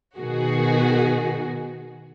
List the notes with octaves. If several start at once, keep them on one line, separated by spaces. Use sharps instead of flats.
B2 D#3 F#4 G#4